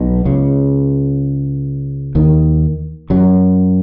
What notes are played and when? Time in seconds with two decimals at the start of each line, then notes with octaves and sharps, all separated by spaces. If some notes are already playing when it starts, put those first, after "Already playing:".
Already playing: B1 B2
0.25 C#2 C#3
2.15 D#2 D#3
3.10 F#2 F#3